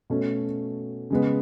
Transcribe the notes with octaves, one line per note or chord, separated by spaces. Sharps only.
B2 A3 C#4
C#3 G#3 B3